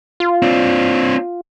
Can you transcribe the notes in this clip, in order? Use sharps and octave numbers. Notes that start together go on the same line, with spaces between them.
F4
C4 D4